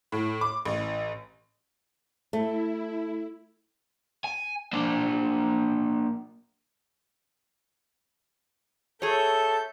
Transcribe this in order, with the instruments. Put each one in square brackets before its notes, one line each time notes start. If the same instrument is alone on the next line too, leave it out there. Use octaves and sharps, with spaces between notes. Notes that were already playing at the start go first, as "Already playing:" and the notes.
[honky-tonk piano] A2
D6
A1
[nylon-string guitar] A3 [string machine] E4
[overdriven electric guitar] G#5
A#3 D4
[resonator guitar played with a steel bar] G#4 C#5 [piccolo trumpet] A4 [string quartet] E5 G6